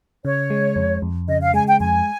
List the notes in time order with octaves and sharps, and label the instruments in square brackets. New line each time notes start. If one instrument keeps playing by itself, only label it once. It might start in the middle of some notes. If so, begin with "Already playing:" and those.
[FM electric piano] C#3 [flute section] C#5
[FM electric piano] G#3
F2
F2
[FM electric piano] C#3 [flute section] D#5
[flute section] F5
[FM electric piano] G#3 [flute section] G#5
[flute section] G5
[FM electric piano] F2 [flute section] G#5